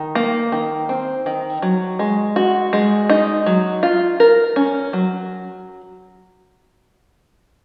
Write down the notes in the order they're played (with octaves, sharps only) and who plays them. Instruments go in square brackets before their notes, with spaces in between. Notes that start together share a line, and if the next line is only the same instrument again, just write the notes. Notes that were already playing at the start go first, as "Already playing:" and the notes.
Already playing: [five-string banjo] D#3
A#3
D#3
C4
D#3
F#3
G#3
F#4
G#3
D#4
F#3
F4
A#4
C#4
F#3